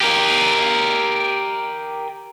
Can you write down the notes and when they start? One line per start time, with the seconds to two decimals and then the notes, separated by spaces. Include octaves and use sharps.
0.01 G4 A#4